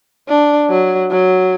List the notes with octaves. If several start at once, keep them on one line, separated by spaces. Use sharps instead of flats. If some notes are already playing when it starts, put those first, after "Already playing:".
D4
F#3
F#3